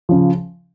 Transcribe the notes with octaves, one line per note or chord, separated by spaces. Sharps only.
C#3 F3